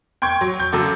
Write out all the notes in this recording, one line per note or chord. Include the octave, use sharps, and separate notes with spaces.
G5 C6 C#6 G#6
F#3
G6
F#2 C#3 F#3 A4 D6